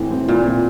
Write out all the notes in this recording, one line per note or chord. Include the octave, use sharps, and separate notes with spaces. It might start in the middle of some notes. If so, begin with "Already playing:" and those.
Already playing: A2 E3 C4
C4
A#2 E3
C4